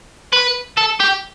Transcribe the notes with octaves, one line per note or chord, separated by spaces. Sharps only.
B4
A4
G4